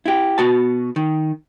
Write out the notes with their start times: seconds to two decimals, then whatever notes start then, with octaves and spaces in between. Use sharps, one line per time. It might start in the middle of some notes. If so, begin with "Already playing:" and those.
0.06 E4 G4
0.38 B2 F#4 A5
0.96 D#3